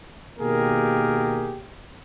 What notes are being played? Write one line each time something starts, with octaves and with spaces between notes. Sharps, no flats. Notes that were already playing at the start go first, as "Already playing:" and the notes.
B2 D#3 A#3 G4 G#4 A#4